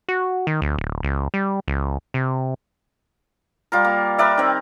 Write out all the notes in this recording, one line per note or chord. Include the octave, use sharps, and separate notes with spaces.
F#4
D#3
D2
D1
C#2
G3
C#2
C3
G3 F4 A#4
A#3
A#4 B4 D5 E5
D#3 C4